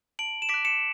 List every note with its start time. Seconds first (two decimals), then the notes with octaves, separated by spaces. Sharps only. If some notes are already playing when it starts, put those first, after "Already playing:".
0.19 A5 D7 F#7
0.42 E7
0.49 D6 B6 D7
0.54 F#6
0.65 C#7 E7